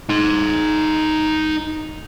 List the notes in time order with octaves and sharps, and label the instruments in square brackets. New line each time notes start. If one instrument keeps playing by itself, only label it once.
[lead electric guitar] D#4 C6